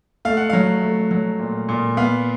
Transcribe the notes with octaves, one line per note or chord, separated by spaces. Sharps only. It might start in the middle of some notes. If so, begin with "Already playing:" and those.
A3 F5
F#5
F#3 F5
A3
F#3
A#2
A#2
B3 F5